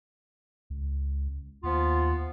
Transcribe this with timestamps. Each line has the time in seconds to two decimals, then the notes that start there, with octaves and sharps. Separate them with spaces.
0.70 C#2
1.63 D#2 F3 B3 F4